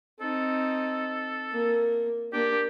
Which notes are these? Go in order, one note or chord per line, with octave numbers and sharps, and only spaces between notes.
C4 D#4 A4
A#3
A#3 D4 G4